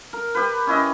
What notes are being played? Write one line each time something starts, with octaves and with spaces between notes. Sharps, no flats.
A#4
G4 B4
C#4 E4 D#5